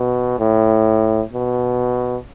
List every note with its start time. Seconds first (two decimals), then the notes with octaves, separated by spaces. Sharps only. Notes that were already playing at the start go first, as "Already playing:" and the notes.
Already playing: B2
0.39 A2
1.33 B2